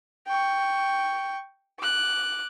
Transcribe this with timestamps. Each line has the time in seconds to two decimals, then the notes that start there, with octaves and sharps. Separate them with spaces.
0.27 G5 C#6
1.80 D6 F#6